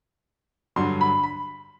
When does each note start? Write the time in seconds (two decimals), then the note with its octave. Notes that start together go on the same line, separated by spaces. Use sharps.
0.76 G2 D3 F#3 C6
1.01 B5
1.24 B5